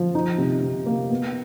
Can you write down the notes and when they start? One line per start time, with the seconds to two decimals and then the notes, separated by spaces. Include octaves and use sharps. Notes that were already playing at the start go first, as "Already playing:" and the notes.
Already playing: F3
0.15 D#4
0.38 C3
0.62 C3
0.86 A#3
1.10 B3